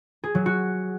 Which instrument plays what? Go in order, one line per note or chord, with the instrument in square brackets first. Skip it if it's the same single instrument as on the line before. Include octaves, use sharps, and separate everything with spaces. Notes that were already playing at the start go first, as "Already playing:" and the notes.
[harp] G#4
F#3
F#4